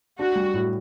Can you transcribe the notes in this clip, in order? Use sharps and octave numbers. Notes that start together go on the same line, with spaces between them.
D4 F#4
G3
A2